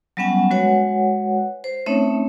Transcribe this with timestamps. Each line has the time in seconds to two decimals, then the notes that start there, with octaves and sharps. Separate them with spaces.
0.17 F#3 G3 B3 C#4 F#5 G#5
0.51 G#3 F#4 B4 C#5 F#5 G#5
1.64 C5
1.86 A3 C4 C#4 D#4 C#5 E5